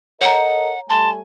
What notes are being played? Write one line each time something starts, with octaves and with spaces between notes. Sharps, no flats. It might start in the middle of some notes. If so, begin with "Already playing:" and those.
A4 A#4 C#5 D#5 F#5 A#5
G3 A3 G#5 A5 C6